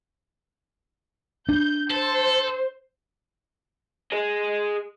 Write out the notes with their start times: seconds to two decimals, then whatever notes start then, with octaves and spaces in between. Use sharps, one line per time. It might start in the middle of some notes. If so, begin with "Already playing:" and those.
1.49 D4 G6
1.90 A4 C5
4.12 G#4 D#5